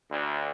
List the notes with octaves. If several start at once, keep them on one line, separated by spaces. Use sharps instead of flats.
D2